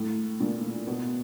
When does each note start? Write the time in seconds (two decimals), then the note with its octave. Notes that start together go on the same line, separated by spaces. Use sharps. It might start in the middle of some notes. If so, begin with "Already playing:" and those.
Already playing: A2
0.40 A#2
0.87 B2